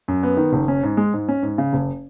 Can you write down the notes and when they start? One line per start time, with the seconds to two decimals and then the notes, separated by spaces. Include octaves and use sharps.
0.08 F#2
0.23 B3
0.37 D#3
0.53 F#1
0.68 C#4
0.83 G#2
0.97 G#3
1.13 G#2
1.29 C#4
1.43 G#2
1.58 C#3
1.73 F#1